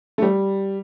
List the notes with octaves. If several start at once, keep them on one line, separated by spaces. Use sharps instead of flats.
A3
G3